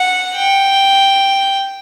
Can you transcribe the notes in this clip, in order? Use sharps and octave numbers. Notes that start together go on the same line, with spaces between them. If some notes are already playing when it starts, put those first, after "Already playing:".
Already playing: F#5
G5